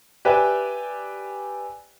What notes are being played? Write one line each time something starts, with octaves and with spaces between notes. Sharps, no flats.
G4 B4 D5 E5 G5 G#5